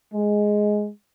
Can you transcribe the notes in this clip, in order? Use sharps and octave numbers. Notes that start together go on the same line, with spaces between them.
G#3